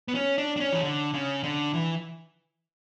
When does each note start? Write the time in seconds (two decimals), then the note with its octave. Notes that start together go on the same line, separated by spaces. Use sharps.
0.08 B3
0.15 C#4
0.38 D4
0.56 D4
0.60 C#4
0.73 E3
0.83 D3
1.14 C#3
1.43 D3
1.74 E3